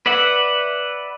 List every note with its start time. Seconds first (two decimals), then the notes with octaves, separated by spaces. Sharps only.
0.06 B4 D5 E5 F#5